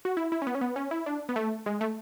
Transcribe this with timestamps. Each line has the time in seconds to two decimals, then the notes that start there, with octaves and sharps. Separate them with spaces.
0.05 F#4
0.17 E4
0.32 E4
0.42 C#4
0.47 B3
0.55 C#4
0.61 B3
0.76 C#4
0.91 E4
1.06 D4
1.29 B3
1.36 A3
1.66 G#3
1.81 A3